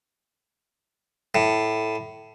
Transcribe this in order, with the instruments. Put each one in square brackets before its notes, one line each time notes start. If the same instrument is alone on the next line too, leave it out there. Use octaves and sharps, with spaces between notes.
[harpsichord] A2